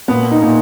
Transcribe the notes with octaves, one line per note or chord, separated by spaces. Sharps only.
A#2 B3
D#4
A#2